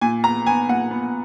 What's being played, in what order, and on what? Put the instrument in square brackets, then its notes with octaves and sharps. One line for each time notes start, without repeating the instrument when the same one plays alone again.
[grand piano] A#2 G#5
B3 A#5
B3 G#5
A#2 F#5
B3